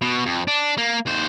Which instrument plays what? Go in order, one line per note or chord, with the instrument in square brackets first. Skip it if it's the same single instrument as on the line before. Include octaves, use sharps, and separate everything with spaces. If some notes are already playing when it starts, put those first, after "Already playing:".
[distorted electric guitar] B2
F2
D4
A#3
D#2 C5